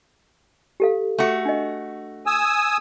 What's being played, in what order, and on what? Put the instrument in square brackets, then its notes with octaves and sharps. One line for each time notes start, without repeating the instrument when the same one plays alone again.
[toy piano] G4 A4 F5
[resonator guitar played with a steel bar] A3 F#4
[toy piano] D4 D#5
[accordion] G#5 D#6 E6